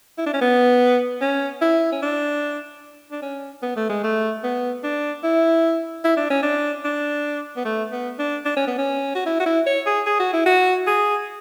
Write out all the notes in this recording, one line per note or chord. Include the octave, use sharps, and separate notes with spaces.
E4
D4
C#4
B3
C#4
E4
C#4
D4
D4
C#4
B3
A3
G#3
A3
B3
D4
E4
E4
D4
C#4
D4
D4
B3
A3
B3
D4
D4
C#4
B3
C#4
F#4
E4
F#4
E4
C#5
G#4
G#4
F#4
E4
F#4
G#4